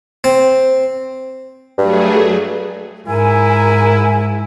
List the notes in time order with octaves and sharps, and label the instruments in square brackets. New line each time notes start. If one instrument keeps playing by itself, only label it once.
[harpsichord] C4
[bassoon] G2 [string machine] F#3 A3 G#4
[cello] G#2 [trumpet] E4 [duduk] A#4 [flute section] G#5